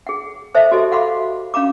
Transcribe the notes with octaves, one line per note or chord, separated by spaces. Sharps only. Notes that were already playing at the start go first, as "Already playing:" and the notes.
G#4 F#5
A4 C5 D#5 E5 A5
F#4 G4 A4 C5 D#5
F5 F#5 B5 C6 D6
C#4 F5 A#5 D6